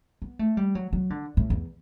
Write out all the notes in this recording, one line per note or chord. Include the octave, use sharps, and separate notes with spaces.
B3
A3
G3
F#3
F#3
D3
A2
E2